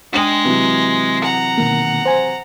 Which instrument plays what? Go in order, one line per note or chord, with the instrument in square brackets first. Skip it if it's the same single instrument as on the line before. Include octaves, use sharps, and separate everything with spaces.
[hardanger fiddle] G#3 [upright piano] D4 G5 F#7
[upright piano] C3 E3 F#3
[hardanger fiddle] F#5 A#5
[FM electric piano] B2 D#3 A#3
C5 G#5